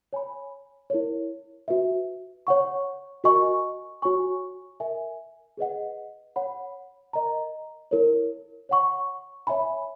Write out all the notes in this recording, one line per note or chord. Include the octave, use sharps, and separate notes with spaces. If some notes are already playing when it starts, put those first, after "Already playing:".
C#5 G#5 B5
E4 A#4 C#5
F#4 B4 E5
C#5 F#5 C#6
F#4 A#4 D#5 G#5 C#6
F#4 C#5 G#5 C#6
A#4 E5 G#5
G#4 B4 D#5 F#5
C#5 F#5 B5
A#4 D#5 A#5
E4 A#4 C#5
C#5 F#5 C#6
C#5 E5 G#5 B5